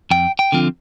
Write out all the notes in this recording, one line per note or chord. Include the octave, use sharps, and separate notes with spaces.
F2 G5
G5
D3 F3 C4 F4